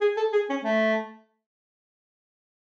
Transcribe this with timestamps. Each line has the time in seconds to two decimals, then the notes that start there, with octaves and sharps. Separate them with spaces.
0.01 G#4
0.17 A4
0.33 G#4
0.50 C#4
0.64 A3